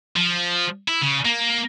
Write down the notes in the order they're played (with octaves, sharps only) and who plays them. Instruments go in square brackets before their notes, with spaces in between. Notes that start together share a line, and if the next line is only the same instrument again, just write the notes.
[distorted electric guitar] F3
E4
C#3
A#3